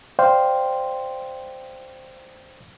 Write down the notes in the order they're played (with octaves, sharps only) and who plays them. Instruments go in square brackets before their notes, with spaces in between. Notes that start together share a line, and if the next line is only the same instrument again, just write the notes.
[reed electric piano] C5 D5 F5 G5 C6